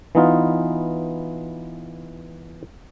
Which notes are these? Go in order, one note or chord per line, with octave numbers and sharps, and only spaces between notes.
E3 B3 D#4 F4